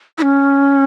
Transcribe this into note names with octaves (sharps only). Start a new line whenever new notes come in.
E4
C#4